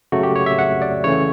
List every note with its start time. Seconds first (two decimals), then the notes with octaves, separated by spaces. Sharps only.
0.12 C#3 F#3 A3 F#4
0.23 G4
0.36 C#5
0.46 E5
0.59 F#5
0.82 D5
1.04 C#3 E3 A3 C#4 C#5